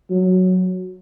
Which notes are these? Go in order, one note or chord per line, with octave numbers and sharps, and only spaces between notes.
F#3